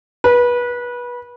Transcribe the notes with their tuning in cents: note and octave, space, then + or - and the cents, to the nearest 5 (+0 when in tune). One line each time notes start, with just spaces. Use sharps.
B4 -25